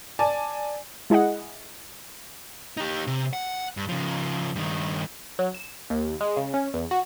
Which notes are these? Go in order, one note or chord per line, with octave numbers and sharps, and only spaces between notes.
D5 G#5 A5
G#3 E4 G#4 D#5 F#5
D#4 G4
C3
F#5
G2
C#3 F3
G2 D#3
F#3
E7
D#2
G#3
C#3
C#4
E2
F#4